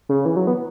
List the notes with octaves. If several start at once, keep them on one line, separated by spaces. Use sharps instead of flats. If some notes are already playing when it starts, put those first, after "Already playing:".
C#3
E3
F#3
B3